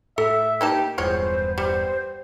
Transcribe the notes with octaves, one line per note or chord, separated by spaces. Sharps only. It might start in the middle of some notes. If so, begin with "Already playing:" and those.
A2 A4 E5
A#3 D#4 G4 A5
E1 E2 G2 F3 G#3 B3 C5 C#5
G3 C5